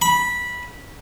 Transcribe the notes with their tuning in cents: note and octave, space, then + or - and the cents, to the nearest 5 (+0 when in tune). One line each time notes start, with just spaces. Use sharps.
B5 -15